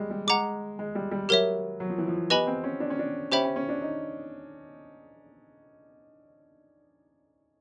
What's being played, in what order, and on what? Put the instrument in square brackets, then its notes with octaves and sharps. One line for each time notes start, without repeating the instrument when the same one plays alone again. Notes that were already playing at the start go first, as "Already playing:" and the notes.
Already playing: [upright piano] G3 G#3
G3
[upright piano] G#3 [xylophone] F#5 A#5 D6
[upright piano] G#3
G3
G3
[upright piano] F#3 [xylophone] G4 A#4 C#5 E5
[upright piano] F#3
F3
E3
F3
[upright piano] B3 [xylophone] G4 B4 D#5 G#5 B5
[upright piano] C4
C#4
D4
C#4
D4
[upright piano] C#4 [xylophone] G4 C5 E5 G5 B5
[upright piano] C#4
C#4
D4
D#4